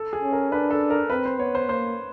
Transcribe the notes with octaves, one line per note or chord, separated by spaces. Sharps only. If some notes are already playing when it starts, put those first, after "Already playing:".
Already playing: A4
G#4
C#4
A#4
D4 B4
A4
A#4
C4 B4
C5
B3 C#5
C5
A#3 C5